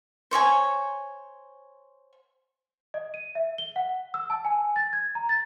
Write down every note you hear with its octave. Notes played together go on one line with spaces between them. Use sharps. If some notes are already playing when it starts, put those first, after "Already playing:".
C5 C#5 D#5 G#5
D#5
D#7
E5
G7
F#5
E6
A5
G#5
A6
G#6
A#5
A6